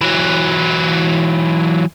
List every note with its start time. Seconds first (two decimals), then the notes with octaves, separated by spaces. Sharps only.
0.01 E3 F#3